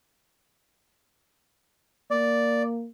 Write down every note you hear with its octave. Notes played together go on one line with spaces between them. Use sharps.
A#3 D5